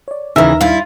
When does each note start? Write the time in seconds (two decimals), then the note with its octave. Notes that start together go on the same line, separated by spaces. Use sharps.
0.08 C#5 D5
0.36 D#2 C#3 E3 D#4 A#4 E5
0.61 G2 E4 F4